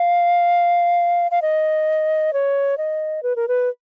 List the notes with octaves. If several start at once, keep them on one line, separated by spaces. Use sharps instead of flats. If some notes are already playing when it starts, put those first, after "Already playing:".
Already playing: F5
F5
D#5
C#5
D#5
B4
A#4
B4